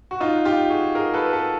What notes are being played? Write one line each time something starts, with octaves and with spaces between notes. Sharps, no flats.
F#4
D#4 F4
F4 G4
F#4 G#4
G#4 A#4
A4 B4
A4 B4